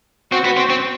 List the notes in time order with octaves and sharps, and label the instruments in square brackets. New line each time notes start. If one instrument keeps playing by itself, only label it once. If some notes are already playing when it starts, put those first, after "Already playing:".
[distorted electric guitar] C4 [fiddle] F#4
[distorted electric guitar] B3
C4
C4